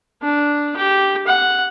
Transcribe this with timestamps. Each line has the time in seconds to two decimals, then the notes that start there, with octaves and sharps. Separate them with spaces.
0.22 D4
0.76 G4
1.27 F#5